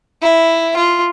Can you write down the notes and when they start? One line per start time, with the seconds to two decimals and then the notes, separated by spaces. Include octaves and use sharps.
0.22 E4
0.77 F4